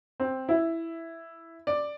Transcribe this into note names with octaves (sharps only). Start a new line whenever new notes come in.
C4
E4
D5